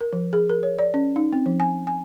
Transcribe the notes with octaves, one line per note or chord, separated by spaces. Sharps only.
A#4
F3
G#4
A#4
C#5
D5
C#4
D#4
C4
F3
G#5
G#5